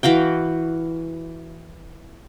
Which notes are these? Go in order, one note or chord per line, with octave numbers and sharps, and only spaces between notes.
E3 F#4 F5 G5